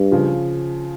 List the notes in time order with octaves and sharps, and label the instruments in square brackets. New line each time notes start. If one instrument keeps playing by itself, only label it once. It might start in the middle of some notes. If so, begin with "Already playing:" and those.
Already playing: [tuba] G2
[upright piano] C#3 F3